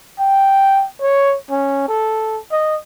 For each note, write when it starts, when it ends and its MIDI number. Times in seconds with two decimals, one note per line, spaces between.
0.19 0.88 79
1.02 1.37 73
1.51 1.84 61
1.88 2.39 69
2.52 2.76 75